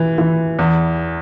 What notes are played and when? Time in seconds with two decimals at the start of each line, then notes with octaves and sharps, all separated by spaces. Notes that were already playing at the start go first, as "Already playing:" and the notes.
Already playing: E3
0.18 E3
0.59 E2